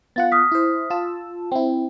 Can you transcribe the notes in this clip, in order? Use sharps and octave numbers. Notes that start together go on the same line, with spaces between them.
B3 F4 F5 F#5 A6
D#6 F6 B6
E4 C5
F4 A5 E6
C4 E4 G5